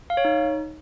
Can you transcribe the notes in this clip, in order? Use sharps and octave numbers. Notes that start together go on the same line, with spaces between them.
F5
C#5
D#4